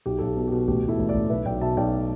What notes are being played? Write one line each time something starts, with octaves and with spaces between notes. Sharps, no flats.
B1 G4
B1 A4
G4
B2
B2 G4
A1 G4
A1
E4 A4
A1
A4 D5
A1
B1 B4 E5
B1 D5 G5
B2 E5 A5
B1 D5 G5